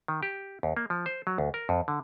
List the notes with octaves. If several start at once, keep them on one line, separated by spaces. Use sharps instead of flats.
D#3
G4
D#2
A#3
F3
C5
F#3
D2
A#4
F2
D3